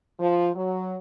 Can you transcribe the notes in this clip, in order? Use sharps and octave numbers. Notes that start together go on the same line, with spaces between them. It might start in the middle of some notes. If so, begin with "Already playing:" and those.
F3
F#3